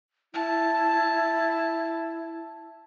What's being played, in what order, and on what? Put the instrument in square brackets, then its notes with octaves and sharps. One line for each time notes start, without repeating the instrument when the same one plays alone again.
[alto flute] E4 [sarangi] A5